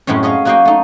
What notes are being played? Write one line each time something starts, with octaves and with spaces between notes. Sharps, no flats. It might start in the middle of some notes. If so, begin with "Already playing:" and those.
F#2 A2 G#3 C4 C#4
G#4 C#5 D#5 F5
F#3 A#3 F#4 D#5 F5 G5
A3 D#4